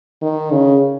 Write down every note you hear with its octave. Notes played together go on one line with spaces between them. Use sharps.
D#3
C#3